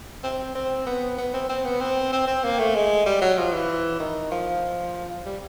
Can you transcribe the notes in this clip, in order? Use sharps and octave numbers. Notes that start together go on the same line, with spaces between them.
C4
C4
B3
B3
C4
C4
B3
C4
C4
C4
A#3
A3
G#3
G3
F#3
F3
E3
D#3
F3
G3